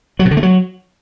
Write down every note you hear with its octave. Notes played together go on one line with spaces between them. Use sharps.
F#3
B2
D3
A3
F#3